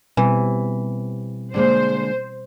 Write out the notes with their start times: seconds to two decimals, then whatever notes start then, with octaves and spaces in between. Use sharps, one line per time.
0.17 B2 E3 G3 C4
1.54 D3 G#3 A#3 C5